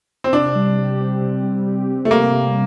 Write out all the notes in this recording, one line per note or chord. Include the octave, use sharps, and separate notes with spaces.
C4
C3 D4
G3
G4
C4
C3
G3
G4
C4
A3
C3 A#3
G3